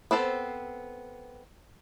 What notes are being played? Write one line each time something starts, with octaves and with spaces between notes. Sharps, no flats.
B3 C4 A4 C5